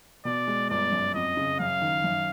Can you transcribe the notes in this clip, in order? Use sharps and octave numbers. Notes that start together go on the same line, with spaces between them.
B2 D5
G#3
G1 D5
F#2
F2 D#5
C#3
F#2 F5
D#3
F#2